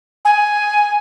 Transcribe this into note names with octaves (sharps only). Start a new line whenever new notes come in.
G#5